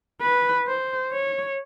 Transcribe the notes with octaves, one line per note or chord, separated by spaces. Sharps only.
B4
C5
C#5